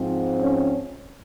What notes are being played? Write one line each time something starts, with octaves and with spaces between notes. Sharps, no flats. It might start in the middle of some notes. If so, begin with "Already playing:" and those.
Already playing: G#2 F3 C4
C#4